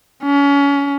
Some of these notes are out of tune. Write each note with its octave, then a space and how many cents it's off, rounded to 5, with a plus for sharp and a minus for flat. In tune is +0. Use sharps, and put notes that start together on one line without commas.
C#4 +30